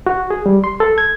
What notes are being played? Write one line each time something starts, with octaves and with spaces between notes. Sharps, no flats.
F#4
G#4
G3
C6
A4
G#6